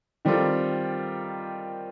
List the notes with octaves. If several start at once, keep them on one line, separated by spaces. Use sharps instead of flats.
D#3 G3 C4 F4 A4